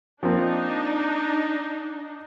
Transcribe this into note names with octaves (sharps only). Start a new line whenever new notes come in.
F3 A#3 C4 D4 D#4